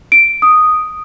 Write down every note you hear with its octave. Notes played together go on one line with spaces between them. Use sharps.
D7
D#6